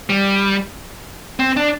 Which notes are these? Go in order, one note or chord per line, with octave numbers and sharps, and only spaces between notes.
G3
C4
D4